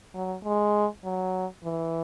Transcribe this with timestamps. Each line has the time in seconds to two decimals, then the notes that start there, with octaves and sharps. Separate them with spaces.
0.14 F#3
0.44 G#3
1.04 F#3
1.64 E3